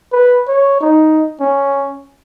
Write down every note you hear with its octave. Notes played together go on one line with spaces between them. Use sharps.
B4
C#5
D#4
C#4